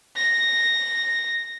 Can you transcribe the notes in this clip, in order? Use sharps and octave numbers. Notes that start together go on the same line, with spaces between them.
A#6